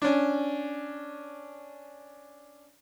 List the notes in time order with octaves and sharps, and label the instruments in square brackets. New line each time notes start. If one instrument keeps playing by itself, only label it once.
[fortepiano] C#4 D4